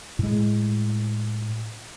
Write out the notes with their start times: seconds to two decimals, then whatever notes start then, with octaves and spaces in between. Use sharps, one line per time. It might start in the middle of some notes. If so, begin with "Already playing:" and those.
0.19 A2 G#3